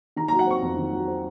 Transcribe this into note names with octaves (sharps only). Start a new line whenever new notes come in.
D#3 A#5
A#5
F#3
F#5
C4 C#6
F2
D#3
F#3
C4